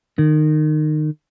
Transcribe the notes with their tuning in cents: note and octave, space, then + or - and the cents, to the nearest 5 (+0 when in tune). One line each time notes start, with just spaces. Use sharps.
D#3 -25